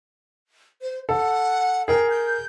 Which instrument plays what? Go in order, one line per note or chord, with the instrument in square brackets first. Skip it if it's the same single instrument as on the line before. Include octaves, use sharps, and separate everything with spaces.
[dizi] C5
[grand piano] A4 [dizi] F#5
[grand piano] G#4 A#4 [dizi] G5
[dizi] G6